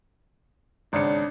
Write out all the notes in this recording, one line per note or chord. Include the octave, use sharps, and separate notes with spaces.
G#1 C#3 D4 C#7